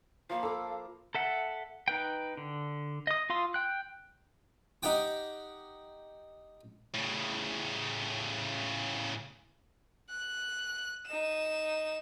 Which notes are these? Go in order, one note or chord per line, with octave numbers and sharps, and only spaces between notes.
F3 A#3 F5 B5
A4 A#5 D6
A4 E5 F#5
D#4 B4 G5
D3
D#5 D#6
F4 F5 C6 D#6 E6
G5 F#6
D#4 G4 F#5 G5 D6
A2 C#3
F#6
D#4 E7